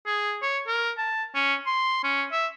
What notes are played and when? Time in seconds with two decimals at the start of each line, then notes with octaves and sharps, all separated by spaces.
0.06 G#4
0.42 C#5
0.68 A#4
0.98 A5
1.35 C#4
1.66 C6
2.04 C#4
2.32 E5